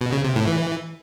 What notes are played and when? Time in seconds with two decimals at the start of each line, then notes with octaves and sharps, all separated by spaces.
0.01 B2
0.12 C#3
0.24 C3
0.36 A2
0.48 E3